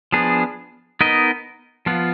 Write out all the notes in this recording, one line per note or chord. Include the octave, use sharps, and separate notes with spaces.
F3 B3 D4 G#4
B3 D#4 A#4 D#5
F3 B3 F4